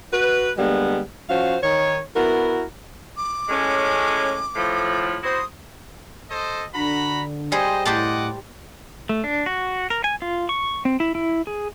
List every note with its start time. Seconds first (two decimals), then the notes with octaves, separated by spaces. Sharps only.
0.12 F#4 B4
0.57 D3 G3 G#3 A#3 B3
1.28 F3 C#4 F#4 C5 F5
1.62 D#3 C#5
2.15 B3 E4 F#4 A#4
3.17 D6
3.49 A2 G#3 C#4
4.56 A2 F3
5.24 E4 F#4 C5 D#6
6.30 A4 C5 D#5
6.74 D3 F#4 A#5 B5
7.52 G3 G#4 C5 D#5
7.85 A2 G4 C5 D#5 F#5 A5 D6
9.09 A3
9.24 D4
9.46 F#4
9.90 A#4
10.04 G#5
10.22 F4
10.49 C#6
10.85 C4
11.00 E4
11.15 E4
11.47 G#4